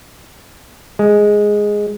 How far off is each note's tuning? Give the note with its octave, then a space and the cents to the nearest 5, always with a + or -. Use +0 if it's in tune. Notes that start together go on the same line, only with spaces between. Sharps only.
G#3 +0